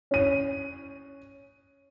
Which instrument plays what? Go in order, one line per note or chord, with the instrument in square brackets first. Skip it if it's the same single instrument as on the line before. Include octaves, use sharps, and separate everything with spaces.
[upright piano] C#4 D#7